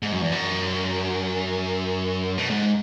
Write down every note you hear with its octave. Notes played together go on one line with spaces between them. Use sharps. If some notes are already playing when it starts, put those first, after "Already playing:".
G#2
F#2
E2
F#2
B2
G#2